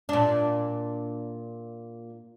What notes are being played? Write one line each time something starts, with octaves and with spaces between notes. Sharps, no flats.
A#2 D4